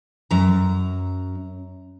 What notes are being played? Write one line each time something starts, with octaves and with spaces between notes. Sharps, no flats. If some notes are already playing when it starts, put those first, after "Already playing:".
F#2 A#5